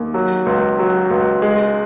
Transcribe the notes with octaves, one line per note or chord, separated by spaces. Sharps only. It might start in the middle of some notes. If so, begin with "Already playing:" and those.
Already playing: D#2
F#3
C#2
F#3
C#2
G#3